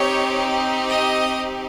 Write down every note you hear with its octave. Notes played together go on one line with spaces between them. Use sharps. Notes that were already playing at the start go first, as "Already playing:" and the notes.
Already playing: C4 D#4 G4 C#5
D#5